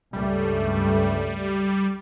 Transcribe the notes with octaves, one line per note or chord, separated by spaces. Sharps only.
C#2 G2 G3 A3